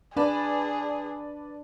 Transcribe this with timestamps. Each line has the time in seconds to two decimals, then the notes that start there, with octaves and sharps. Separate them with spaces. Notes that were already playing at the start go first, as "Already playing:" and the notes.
0.17 D4 G#4 B4 D5 A5